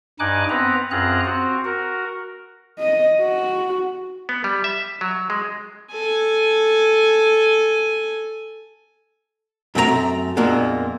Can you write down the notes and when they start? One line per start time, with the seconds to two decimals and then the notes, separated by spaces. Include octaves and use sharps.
0.20 G2 D#4 G#5 D6 F#6
0.50 B3 C4 B4 A#5
0.91 F#2 C4 F4 G#4 A#5 F#6
1.25 C4 F#4
1.65 F#4 A#4
2.79 D#5
3.21 F#4
4.29 B3
4.44 G3
4.64 E5
5.01 F#3
5.30 G#3
5.91 A4 G#5
9.75 F#2 A3 C4 F#4 A#5
10.37 F2 A#2 G#3 A#3 B3 D4